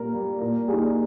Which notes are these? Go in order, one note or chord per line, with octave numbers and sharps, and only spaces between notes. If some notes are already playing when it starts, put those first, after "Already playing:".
Already playing: A#2 G3 A#3 A#4
G3 A#3
A#2 A#4
G3 A#3 D#4 G#4